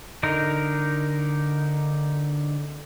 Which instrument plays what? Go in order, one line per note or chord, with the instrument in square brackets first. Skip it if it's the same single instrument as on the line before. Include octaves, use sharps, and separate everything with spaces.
[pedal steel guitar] D3 D#4 A#4